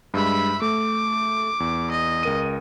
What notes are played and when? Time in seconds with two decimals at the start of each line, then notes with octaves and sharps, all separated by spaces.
0.14 G2 G#3 E5 B5
0.62 A3 D6
1.60 E2
1.91 D#5
2.23 C#2 A#4 D#7